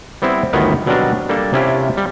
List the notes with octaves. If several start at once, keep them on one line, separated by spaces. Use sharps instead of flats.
G3 B3 C4 E4
G1 D2 D#3 E3 B3 A#4
B2 F#3 G3 C4 D4 A#4
G3 A#3 D4 A4
C3 C#4 E4 F4 G4
G3